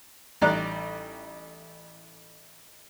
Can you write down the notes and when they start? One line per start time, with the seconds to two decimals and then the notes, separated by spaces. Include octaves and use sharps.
0.41 A1 G3 D#4 D5 A#5 F#6